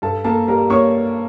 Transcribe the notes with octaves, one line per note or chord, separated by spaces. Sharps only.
G2 A4 A5
A#3 A4 A5
G3 A#4 A#5
A#3 C#5 C#6